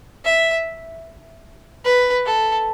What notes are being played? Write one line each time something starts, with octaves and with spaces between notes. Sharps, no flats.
E5
B4
A4